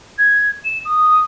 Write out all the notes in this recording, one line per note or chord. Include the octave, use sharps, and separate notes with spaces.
G#6
E7
D#6